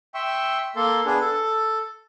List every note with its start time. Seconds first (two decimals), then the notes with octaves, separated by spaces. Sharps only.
0.14 E5 G5 C6 C#6 E6
0.76 A#3 A4 C6
1.06 B3 D4 G#4
1.21 A4